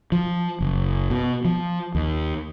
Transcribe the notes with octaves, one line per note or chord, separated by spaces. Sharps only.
F3
F#1
B2
F3
D#2